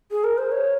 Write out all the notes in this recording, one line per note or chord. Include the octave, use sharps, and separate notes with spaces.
G#4
A#4
C5
C#5